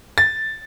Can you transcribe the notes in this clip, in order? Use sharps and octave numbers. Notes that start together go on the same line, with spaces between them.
A6